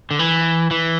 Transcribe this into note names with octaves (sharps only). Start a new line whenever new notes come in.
D3
E3
E3